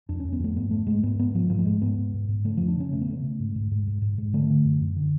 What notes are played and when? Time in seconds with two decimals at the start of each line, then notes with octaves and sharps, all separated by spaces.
0.09 F2 D4
0.20 C#4
0.24 F2
0.33 B3
0.40 F2 A3
0.56 G#2 B3
0.71 G#2 A3
0.87 G#2 G#3
1.03 G#2 B3
1.19 G#2 B3
1.35 G#2 F3
1.50 G#2 F3
1.59 A3
1.65 G#2 G#3
1.82 G#2 B3
1.98 G#2
2.14 G#2
2.28 G#2
2.44 C#3 A3
2.57 F2 F3
2.68 D4
2.76 C#3 C#4
2.93 C#3 A3
3.01 B3
3.08 C#3 A3
3.24 C#3
3.40 G#2
3.56 G#2
3.71 G#2
3.87 G#2
4.02 G#2
4.18 G#2
4.33 D3 A3
4.50 D3
4.65 F#2
4.81 F#2
4.96 D3